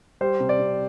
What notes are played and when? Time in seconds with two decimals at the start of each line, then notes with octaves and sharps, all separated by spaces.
0.21 G3 C5
0.40 C3
0.49 D5
0.59 C3